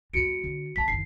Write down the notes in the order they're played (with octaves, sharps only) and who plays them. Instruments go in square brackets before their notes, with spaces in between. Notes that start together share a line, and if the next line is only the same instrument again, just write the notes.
[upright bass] E2 G3 [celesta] F#4 C#7 D7
[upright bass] D3
[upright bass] D3 B3 [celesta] A5 B6
[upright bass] F#1 D#3 [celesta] C7